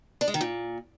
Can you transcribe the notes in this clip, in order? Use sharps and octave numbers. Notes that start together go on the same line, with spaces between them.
D4
G#3
D#3
A#2